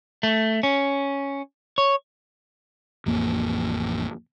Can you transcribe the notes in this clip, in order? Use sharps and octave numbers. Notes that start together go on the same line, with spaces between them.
A3
C#4
C#5
A1 F2 A#3